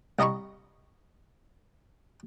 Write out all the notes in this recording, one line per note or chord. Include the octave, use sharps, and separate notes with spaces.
C2 D#5 A#5 B5 C#6